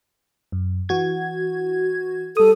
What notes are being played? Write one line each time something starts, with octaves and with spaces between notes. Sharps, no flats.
F#2
E3 F#4 G#6
G3 A4 D#6